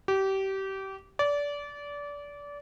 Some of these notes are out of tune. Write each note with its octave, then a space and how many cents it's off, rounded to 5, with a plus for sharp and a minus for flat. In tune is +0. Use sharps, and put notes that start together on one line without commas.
G4 -25
D5 -25